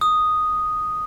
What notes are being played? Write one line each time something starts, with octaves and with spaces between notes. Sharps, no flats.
D#6